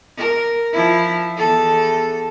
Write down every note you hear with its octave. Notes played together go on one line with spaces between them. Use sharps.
A#4
F3 E4
E2 A4